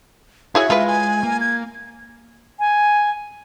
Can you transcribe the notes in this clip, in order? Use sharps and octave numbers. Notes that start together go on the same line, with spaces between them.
E4 F#4 G#4 C#5 E5
G#3 F4 B4
G#5
A#3
G#6
G#5